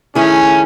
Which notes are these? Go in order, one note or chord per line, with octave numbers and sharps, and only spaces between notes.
D#3 A3 C#4 E4 G#4